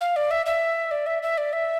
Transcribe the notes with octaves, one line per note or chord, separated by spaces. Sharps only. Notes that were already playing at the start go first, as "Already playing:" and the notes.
F5
D5
E5
E5
D5
E5
E5
D5
E5